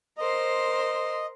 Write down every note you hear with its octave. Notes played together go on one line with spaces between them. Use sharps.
A#4 C5 D#5 C6